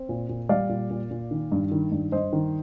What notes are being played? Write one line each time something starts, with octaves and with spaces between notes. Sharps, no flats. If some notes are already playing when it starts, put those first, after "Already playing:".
Already playing: C4
A#2
A#2
G3 D5 F5
A#2
A#2
A#2
D#3
G2
D#3
G2
G2 C5 D#5
D#3